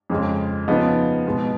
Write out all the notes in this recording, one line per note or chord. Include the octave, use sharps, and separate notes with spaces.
F2 C#3 G#3
C#3 F3 B3 D#4
B2 G#3 B3